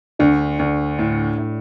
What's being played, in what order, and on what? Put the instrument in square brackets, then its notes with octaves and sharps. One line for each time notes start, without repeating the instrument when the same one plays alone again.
[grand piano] D2 [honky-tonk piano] D4
[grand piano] D2
A2
A2